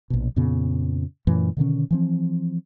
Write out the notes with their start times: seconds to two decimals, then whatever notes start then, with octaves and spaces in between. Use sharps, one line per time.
0.10 A#1 B2
0.36 F2 A#2 C#3 B3
1.27 F#2 A#2 E3 A3
1.57 B2 D3 D#3 C#4
1.91 E3 F3 C4